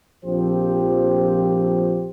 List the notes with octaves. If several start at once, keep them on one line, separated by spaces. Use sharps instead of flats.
A#1 F3 C4 G4 C5